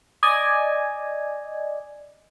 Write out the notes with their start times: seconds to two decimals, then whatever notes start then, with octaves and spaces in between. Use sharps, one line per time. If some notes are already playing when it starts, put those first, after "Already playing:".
0.23 D5 D#5 G#5